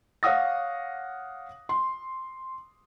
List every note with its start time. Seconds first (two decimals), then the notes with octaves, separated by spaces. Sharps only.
0.23 C#5 F5 F#5 D#6 A#6
1.69 C6